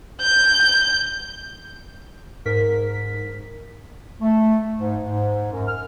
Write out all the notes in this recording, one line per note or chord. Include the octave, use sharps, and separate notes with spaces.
G6
G#2 A#4 B6
A3
G#2
G#2
F#2
F6